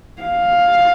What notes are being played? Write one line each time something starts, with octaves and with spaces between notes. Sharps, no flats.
F5